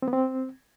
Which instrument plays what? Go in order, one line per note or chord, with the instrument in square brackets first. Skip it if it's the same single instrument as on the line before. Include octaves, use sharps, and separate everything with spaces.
[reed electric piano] C4
B3
C4